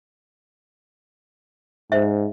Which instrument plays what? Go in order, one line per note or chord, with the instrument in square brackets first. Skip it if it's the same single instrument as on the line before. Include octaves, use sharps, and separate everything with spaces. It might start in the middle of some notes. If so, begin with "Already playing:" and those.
[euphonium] G#2 [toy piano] C5 E5